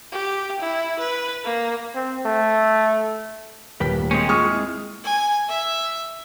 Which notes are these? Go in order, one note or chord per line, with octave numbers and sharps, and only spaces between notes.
G4
E4
B4
A#3
C4
A3
D#1 A#4 B4 G5 B6
A2
G#3 A#3 C4 C#4
G#3 A#3 F4 G#4 C#6 D#6 F6
C4 E4
G#5
E5